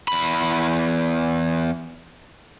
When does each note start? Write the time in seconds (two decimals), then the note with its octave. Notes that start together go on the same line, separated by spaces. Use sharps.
0.08 E2 B5